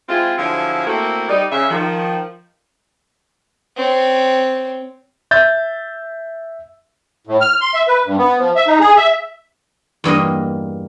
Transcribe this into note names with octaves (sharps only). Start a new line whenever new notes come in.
G#3 C4 E4 F4
D3 F3 F#3 E4 G#4 F5
A3 A#3 C4 E4 F#4 A4
G3 D#4 D5
C#3 E5
D#3 F3
C4 C#5
E5 G6 A6
A2
F6
C6
E5
B4
G2
B3
F3
E5
D#4
G#4
E5
E2 G2 A#3 D#5